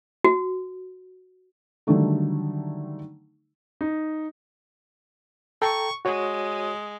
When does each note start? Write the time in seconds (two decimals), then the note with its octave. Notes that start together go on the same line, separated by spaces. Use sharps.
0.24 F#4
1.87 D3 D#3 F#3 G3 A3 D#4
3.81 D#4
5.62 A4 G5 A#5 C#6
6.05 G#3 F#4 C#5